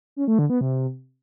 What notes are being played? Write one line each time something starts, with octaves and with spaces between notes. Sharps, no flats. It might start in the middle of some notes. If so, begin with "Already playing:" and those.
C#4
A3
D3
B3
C3